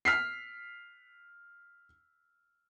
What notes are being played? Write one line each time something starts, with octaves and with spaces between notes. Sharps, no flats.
F6 B6 C7